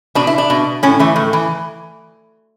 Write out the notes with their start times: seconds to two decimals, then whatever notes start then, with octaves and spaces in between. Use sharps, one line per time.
0.15 B2 D4
0.27 E4
0.38 D4
0.50 B2
0.83 A2 C#4
0.99 E3 A3
1.16 A2
1.33 E3